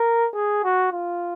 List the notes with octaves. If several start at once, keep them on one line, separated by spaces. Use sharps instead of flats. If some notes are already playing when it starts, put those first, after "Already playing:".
Already playing: A#4
G#4
F#4
F4